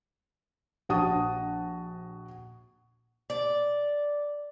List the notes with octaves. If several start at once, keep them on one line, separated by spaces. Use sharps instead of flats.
A#1 F#4 A5 D#6
D5